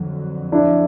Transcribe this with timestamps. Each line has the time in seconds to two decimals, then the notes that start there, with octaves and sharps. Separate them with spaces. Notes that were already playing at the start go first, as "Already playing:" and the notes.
Already playing: F2 D3 F#3
0.52 D4 E4